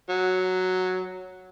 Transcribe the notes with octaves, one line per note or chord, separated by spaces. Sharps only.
F#3